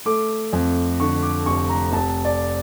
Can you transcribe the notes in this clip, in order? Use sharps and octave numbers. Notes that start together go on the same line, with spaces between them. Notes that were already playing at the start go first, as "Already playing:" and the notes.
A3 D6
F2
D3 C#6
D6
F1 C#6
A#5
F1 A5
D5